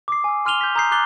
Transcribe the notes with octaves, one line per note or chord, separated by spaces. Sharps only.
D6 D#6 C7
G#5 E6
C6 F6 D#7 F7 G7
G6 B6
A#5 D#6 G6 C7
D6 F#6 A6 C7 G7